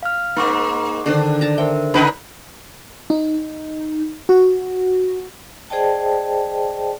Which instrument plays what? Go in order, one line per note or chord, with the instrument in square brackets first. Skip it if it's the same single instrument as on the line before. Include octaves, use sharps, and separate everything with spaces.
[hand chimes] F5 F6
[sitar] G#2 A#3 [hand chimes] D#4 C#6 D6
[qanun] D3 D#3 C5 [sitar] D4
[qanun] A5 A#5
[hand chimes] A#4 C5 E5 [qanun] G5
[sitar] C#3 D#4 B4 [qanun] D4 A#4 C#5 [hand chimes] B5
[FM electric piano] D#4
F#4
[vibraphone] G#4 C5 D5 D#5 G5 A5